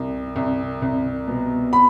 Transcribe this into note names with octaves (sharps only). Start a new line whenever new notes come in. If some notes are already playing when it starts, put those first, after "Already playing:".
Already playing: C2
C2
C2
B2
B5